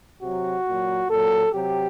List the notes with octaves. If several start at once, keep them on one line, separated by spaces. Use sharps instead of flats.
C3 F#3 F#4
A#2 F#3
A#2 F#3 A4
C3 F#3 G4